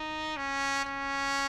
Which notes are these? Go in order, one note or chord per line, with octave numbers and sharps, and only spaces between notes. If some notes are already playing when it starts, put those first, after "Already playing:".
Already playing: D#4
C#4
C#4